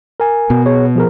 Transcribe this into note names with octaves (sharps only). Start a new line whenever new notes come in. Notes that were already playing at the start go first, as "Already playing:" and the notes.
A#4 G#5
B2 B3
G#4 C#5
F3 G#4 A#4